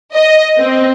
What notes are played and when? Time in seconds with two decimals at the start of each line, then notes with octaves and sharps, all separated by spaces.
0.13 D#5
0.58 C4